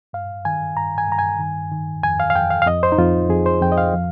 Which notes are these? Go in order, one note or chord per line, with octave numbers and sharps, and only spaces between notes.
G2 F5
D#3 G#5
G2 A#5
G#5
G2 A#5
G#5
D#3
D#3
F2 G#5
F5
F5
F2 G5
F5
F5
F2 D#5
C5
D#4
F2 F4
F2 G#4
C5
F2 G5
D#5
F5
F3